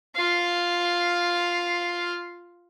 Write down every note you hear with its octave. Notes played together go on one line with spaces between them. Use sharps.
F4 F5